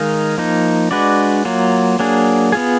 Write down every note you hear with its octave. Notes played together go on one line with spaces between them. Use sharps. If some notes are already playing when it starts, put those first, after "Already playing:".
Already playing: D#3 G#3 D#4 A#4 F5
F3 A#3 D#4
G#3 D4 F#4 B4 D5
F#3 A#3 F4
F#3 A#3 D4 G#4
B3 F4 G#4